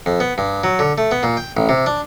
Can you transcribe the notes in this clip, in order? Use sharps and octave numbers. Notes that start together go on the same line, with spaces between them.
F2
B3
G2
F#3
D3
A3
B3
A#2
G5
A1
C3
D4